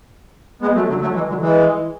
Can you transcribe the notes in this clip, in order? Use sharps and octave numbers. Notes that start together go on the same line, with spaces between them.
G#3 B3
F#3 A3
D3 F#3
F#3 A3
E3 G#3
D3 F#3
E3 G#3